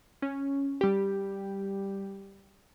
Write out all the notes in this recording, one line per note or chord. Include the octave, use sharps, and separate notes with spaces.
C#4
G3 G4